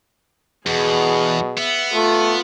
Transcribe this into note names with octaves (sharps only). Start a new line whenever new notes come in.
E2 B2 G#4
B3 E5
A3 F4